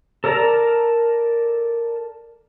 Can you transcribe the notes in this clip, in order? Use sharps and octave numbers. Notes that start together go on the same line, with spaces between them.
A4 A#4 D5 A5 A#5